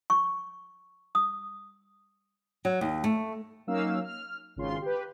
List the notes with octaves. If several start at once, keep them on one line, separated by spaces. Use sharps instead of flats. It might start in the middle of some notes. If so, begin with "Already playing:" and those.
C#6
D#6
F#3
D#2
A3
F#3 A#3 C#4 D#4 F5 E6
F6
G#1 C#3 F4 C6
G4 B4